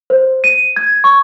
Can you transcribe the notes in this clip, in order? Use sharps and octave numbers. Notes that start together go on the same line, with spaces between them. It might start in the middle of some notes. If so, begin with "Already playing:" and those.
C5
D#7
G#6
C#6